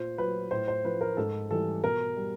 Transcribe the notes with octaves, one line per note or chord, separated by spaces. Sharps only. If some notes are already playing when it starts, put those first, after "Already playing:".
Already playing: A#2 C5
F#3 B4
A2 C5
C5
F3 B4
A#4
G#2 A4
E3 G3 A4
B2 A#4
G3